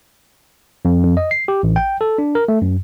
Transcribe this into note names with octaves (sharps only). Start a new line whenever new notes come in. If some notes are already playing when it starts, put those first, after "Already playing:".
F2
F2
D#5
C7
G4
A1
G5
A4
D4
A#4
A3
F#2